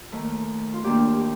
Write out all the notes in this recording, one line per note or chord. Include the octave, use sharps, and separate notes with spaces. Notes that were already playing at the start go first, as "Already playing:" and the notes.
Already playing: F4
D#2 D#3 A3
F4
D#2 D#3 A#3 D4 G4
G4